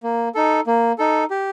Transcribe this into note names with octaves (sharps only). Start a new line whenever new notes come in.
A#3
D#4 A4
A#3
D#4 A4
G4